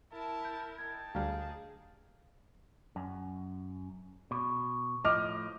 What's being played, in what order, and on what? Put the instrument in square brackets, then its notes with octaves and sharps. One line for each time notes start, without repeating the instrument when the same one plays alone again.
[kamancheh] E4 A#4 [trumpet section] A5
[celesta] G6
[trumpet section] D#4 G5 A5 [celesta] G#6
[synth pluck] D2 G3 [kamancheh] G#4 [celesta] F5 A#5 F6
[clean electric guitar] F#2
B2
[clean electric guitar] A2 F3 [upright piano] D#5 D6 F6